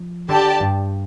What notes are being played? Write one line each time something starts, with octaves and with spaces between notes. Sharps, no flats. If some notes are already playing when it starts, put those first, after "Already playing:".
Already playing: F3
D3 G4 D5 A5
G2